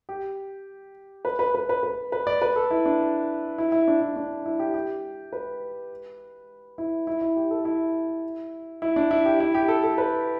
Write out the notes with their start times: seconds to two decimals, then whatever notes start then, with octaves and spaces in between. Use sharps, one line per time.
0.09 G4
1.25 B4
1.39 B4
1.55 B4
1.69 B4
1.83 B4
2.12 B4
2.27 D5
2.42 B4
2.56 A4
2.71 E4
2.86 D4
3.58 E4
3.72 E4
3.88 D4
4.01 E4
4.16 D4
4.46 E4
4.59 G4
4.74 G4
5.33 B4
6.78 E4
7.07 E4
7.21 E4
7.36 G4
7.51 A4
7.65 E4
8.82 E4
8.96 D4
9.11 E4
9.25 G4
9.40 E4
9.55 G4
9.68 A4
9.83 A4
9.98 B4